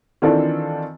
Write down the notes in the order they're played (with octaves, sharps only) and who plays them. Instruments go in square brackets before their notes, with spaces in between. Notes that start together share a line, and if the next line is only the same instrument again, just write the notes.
[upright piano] D#3 E3 C4 D4 F4 A4